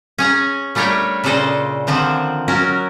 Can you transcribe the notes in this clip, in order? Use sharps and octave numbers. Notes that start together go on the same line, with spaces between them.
C#4 G#4 A#5
G3 A3 D4 A#4 C#5 G5
A#2 C#3 D4 A4 C5 D#5
D3 D#3 F3 C4 D4
F#3 C#4 F#4 A#4